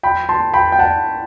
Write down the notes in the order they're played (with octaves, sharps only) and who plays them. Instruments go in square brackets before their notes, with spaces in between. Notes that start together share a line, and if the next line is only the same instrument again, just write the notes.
[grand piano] G5 B5
A5 C6
G5 B5
G5
F#5 A5